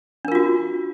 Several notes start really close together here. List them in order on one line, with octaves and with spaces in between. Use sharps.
D4 A#4 F4 F#4